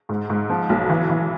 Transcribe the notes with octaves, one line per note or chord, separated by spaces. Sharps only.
G#2
G#2
F3
B1
E3
E3